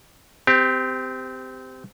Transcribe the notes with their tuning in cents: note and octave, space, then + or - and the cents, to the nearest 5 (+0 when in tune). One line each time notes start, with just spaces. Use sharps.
C4 -25 G4 +10